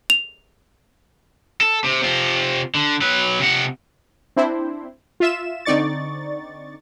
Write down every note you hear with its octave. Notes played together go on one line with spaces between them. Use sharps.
F7
A4
C3
C3 F4
D3
F#3 B4
C3 F#5
C4 D4 E4 C5
F4 E5 E7
D3 C4 D#4 D5 C#6 A6